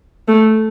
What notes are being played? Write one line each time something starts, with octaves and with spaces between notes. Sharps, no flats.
A3